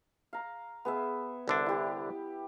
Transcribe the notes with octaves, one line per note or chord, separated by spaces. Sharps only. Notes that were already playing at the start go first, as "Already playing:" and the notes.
F5 A#5
B3 G#4 E5
C2 D3 D4 E5
E4 G4